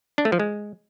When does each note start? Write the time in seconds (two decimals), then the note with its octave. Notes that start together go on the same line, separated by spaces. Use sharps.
0.18 D4
0.25 A3
0.32 F3
0.40 G#3